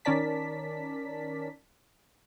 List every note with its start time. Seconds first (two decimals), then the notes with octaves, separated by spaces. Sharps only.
0.05 D#3 C#4 A#4 D5 A5 B6